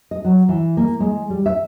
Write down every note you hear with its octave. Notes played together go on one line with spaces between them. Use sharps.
D#5
F#3
E3
A#3
G#3
G3
E5